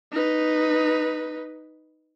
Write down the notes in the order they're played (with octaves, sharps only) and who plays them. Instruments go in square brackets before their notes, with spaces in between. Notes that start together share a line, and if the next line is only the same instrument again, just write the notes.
[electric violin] D#4 B4